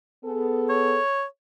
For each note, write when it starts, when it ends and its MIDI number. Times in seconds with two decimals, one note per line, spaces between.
0.24 0.97 59
0.24 0.97 68
0.24 0.97 69
0.69 1.23 73